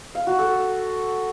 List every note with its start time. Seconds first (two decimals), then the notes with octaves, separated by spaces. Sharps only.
0.15 F5
0.27 F#4
0.39 A4